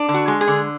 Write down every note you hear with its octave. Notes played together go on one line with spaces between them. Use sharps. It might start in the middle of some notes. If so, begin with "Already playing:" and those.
Already playing: D4
D3
F#4
G#3
G#4
D3